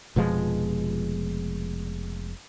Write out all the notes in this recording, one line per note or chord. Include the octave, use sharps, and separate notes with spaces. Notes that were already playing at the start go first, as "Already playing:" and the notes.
F1 B2 F3 G#3